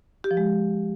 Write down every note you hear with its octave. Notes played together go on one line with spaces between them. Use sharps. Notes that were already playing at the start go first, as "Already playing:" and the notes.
G4
F3
G#3